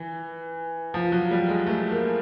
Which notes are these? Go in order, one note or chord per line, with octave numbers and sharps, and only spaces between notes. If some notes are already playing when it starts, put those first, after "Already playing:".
Already playing: E3
F3
F#3
G3
G#3
A3
A#3